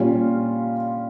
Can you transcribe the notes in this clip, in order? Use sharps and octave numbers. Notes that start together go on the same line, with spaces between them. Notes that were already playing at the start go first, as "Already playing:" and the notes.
Already playing: A#2 G3 C#4 F4